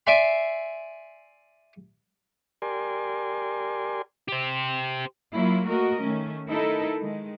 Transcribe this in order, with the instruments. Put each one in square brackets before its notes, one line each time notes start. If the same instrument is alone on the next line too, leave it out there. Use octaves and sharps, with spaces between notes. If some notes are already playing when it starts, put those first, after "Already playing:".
[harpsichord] D5 E5 G#5 C6
[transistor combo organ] G4 A#4 D5 G#5 C6
[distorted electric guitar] G4 C5
[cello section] F#3 A#3 E4 F4
A3 A#3 F#4 A#4 D#5
D#3 A3 C#4
D#4 E4 A4 A#4
D#3 G#3